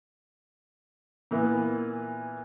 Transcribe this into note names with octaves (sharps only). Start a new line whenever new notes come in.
A#2 E3 A#3 B3